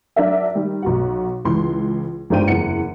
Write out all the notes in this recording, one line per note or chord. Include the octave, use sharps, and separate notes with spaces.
F#3 D4 F#4 A#4 D5 E5
D#3 G3
B1 F#4 F#5
C#2 E3 C6
G1 G#2 D4 C5 G5 D#7
F#1 E2 F#5 C#7